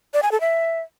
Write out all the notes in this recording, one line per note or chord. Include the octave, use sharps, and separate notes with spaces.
D5
G#5
A4
E5